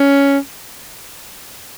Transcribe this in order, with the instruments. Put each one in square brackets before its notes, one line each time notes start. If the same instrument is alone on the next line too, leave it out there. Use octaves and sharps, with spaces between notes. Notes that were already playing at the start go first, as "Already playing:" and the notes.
Already playing: [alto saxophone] C#4